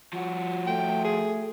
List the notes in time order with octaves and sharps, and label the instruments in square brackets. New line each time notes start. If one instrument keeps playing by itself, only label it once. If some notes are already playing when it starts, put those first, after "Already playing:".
[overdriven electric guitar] F3 F#4
[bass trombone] A3 [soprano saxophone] G5
[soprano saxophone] G#4